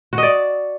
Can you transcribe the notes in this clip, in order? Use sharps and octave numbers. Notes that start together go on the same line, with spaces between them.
F#4
D#5
D5